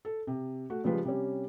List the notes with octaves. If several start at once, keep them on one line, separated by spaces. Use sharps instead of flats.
A4
C3
A3 F#4
C#3 F3 G3 G#3 F4 B4
C3 G3 C#4